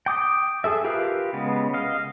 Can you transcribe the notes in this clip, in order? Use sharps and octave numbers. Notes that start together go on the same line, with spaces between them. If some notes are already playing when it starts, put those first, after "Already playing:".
G5 D6 D#6
G#4 A4 E5
F4 G4 A#4 B4 F5
C#3 G#3 B3
D#5 F5